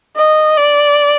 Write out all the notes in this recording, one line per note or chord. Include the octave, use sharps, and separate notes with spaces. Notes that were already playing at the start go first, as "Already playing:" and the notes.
D#5
D5